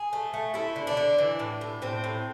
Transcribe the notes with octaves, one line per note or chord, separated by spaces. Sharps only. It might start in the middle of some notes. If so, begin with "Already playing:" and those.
Already playing: G#4
A3
A3
A3 E4
D3
D4
D3
E3
A2
A2
A2 C4
A2